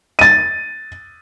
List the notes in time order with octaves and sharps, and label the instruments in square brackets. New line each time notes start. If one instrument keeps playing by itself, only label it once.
[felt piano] A6 D#7